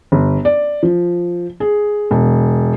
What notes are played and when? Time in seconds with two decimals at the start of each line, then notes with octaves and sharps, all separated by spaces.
0.12 G1
0.45 D5
0.83 F3
1.60 G#4
2.11 E1